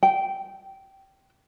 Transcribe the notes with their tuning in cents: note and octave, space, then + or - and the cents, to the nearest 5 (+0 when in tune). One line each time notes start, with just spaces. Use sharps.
G5 -15